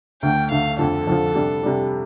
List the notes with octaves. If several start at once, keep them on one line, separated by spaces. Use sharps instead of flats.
D2 D3 A3 G5
D2 D3 A3 F5
F2 D3 F3 A4
F2 D3 F3
C3 G3 D4
C3 G3 D4